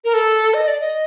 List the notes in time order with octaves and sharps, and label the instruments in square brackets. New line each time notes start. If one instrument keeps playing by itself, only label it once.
[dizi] A#4
A4
D#5
D5
D#5